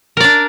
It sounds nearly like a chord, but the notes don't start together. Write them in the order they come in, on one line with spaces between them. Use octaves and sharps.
A#4 D5 D4